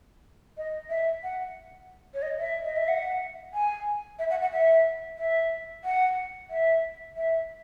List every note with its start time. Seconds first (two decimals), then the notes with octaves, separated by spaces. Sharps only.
0.57 D#5
0.90 E5
1.23 F#5
2.14 C#5
2.22 D#5
2.39 E5
2.65 D#5
2.77 E5
2.88 F#5
3.54 G#5
4.19 E5
4.30 F#5
4.42 F#5
4.52 E5
5.18 E5
5.84 F#5
6.50 E5
7.17 E5